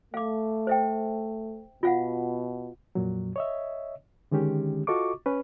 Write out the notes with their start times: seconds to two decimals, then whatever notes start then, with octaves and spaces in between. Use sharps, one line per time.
0.14 A3 F5 D6
0.67 C5 E5 G5
1.83 B2 F4 F5 F#5
2.95 F2 A#2 F#3
3.36 C#5 D#5 E5
4.31 D3 D#3 G#3 C#4 G4
4.87 F4 F#4 A4 D#5 C#6 D6
5.26 C#4 B4